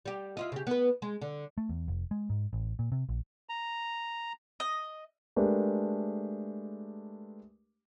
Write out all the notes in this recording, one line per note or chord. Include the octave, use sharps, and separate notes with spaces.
G3 G4
E4 F4 D#5
C#3 G4
B3 B4
G#3
D3
A3
E2
F1
G#3
G#2
A1
A#2
C3
A#1
A#5
D#5
G#3 A3 D4 G4 A#4 B4